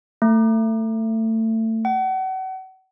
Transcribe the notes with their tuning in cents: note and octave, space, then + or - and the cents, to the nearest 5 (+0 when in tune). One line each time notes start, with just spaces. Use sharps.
A3 +25
F#5 +35